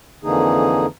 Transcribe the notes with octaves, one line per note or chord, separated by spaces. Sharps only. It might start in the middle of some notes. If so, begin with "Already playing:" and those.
F2 D3 E3 A#3 D#4 G#4